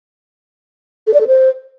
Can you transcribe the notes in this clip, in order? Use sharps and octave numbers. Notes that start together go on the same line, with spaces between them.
A4
D5
A4
C5